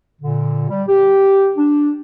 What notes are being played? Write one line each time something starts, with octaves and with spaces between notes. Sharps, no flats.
A#2 D3
G3
G4
D4